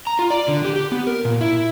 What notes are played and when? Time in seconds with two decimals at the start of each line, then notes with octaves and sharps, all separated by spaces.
0.07 A#5
0.19 F4
0.30 D5
0.48 D3
0.65 G4
0.76 G4
0.92 B3
1.07 A#4
1.25 A#2
1.41 E4